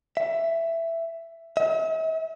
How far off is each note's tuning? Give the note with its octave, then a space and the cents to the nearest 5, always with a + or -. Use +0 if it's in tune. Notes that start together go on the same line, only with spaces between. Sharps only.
E5 +10
E5 -45